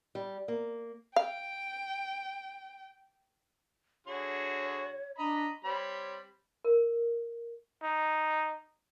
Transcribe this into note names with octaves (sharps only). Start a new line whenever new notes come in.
G3
A#3
F5 G5
D3 F#4 G#4 C#5
D4 D#5 A#5 B5
G3 C4 C#5 B5
A#4
D#4